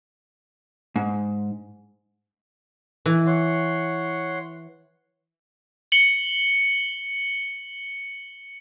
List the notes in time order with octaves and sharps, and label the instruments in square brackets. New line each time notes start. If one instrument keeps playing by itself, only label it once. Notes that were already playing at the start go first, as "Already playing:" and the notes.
[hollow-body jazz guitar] G#2
[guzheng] E3
[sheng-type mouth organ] C#5 F#5 C6
[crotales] C#7 F#7 G7